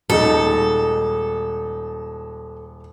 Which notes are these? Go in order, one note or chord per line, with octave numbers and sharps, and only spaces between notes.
D#1 G#3 D#4 A4